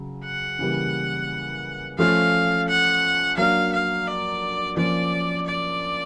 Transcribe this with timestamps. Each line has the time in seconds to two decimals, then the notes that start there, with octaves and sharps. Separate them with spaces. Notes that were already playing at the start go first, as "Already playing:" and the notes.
Already playing: C#3 F#3
0.24 F#5
0.59 C#3 E3 G3 A#3
1.98 F3 A3 C#4 F4 F5
2.68 F#5
3.37 F#3 A#3 D4 F5
3.73 F5
4.07 D5
4.77 F3 A#3 C#4 F4 D5
5.46 D5